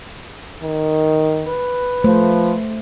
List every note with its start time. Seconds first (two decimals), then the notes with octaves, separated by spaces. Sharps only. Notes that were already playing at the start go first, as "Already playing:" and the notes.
0.62 D#3
1.47 B4
2.04 F3 A3 C5